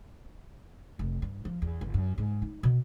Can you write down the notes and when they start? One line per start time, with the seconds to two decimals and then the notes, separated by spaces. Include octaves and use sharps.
0.99 F1
1.22 G2
1.45 F3
1.62 E2
1.81 G1
1.94 F#2
2.18 G#2
2.42 D#4
2.63 B2